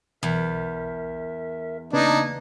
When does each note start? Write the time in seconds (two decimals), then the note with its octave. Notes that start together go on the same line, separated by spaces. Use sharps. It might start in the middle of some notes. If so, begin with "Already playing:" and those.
0.23 B1 E2 A#4 E5
1.93 C#3 A#3 B3 D4 D#4 B4 G#6